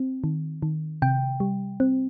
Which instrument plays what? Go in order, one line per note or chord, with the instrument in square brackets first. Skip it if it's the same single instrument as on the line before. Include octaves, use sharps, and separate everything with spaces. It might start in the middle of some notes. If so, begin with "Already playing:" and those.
Already playing: [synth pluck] C4
D#3
D#3
C3 G5
G3
C4